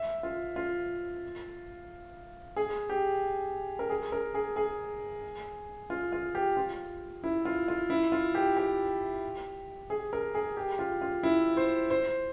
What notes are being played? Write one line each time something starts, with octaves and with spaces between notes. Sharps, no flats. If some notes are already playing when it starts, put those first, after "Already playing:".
Already playing: E5
F4
F4
G#4
G4
A#4
G#4
A#4
G#4
G#4
F4
F4
G4
F4
E4
F4
F4
E4
F4
G4
G4
G#4
A#4
G#4
G4
F4
F4
E4
C5
C5